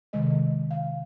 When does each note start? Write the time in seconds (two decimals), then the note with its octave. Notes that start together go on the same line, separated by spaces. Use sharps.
0.13 C3 D#3 G#3 D#5
0.71 F5